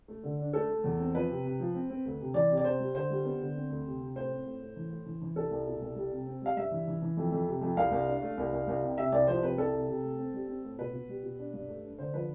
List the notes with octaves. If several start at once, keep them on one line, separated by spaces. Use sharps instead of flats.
A3
D3
D4
A3 A4
A3
E2
C4
F3 B4
C3
C3
F3
C4
C4
D2
C3
E3 D5
C3
D5
C3 C5
G3
D3 C5
G3
B3
D3
C4
D2
C3
C3
A2 C5
C4
A2
A2
E3
A2
E3
E3
C2 A4
C2
B2
C2
G3
C3
C4
G3 F5
G2 E5
E3
E3
E3
F2
F2
C3
F2
C2 F5
C2
D4
A3
C2
C2
C2
C3
C3 E5
C2 D5
F3 C5
C3 B4
C2 A4
C3
C3
A3
C4
G3
C4
A2
B2 B4
B2
G3
B2
D4
G2
A3
D4
D3 C5
F3 B4